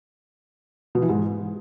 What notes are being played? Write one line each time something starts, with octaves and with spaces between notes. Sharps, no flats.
B2
E3
G#2